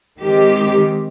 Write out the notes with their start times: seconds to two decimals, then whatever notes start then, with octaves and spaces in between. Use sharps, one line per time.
0.20 D#3 G#3 C4 G4